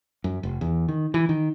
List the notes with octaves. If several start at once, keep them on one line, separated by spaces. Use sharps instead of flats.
F#2
F1
E2
D#3
E3
D#3